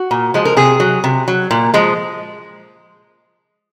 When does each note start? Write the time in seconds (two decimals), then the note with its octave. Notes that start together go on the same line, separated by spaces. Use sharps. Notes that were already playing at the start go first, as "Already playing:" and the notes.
Already playing: F#4
0.11 A#2
0.34 F3 G#3
0.45 A#4
0.57 C3 G#4
0.80 F#3
1.04 C3
1.28 F#3
1.51 A#2
1.74 F3 G#3